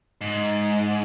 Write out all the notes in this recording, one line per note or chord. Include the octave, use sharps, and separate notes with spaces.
G#2